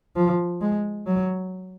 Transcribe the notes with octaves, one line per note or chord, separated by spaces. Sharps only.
F3
G#3
F#3